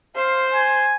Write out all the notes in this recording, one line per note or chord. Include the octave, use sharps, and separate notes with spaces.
C5 F5
G#5